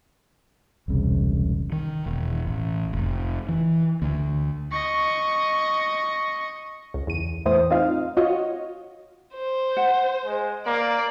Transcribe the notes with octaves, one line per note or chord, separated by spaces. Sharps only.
E1 C2 C#3
D#3
E1
A1
F1
E3
D2
D#5 C#6
C#2
E2 D#7
E2 A2 E3 C5 D#6
C4 D#4 F4 F5
F4 F#4 C#5 D#5
C5
F#5
G#3
A#3 D5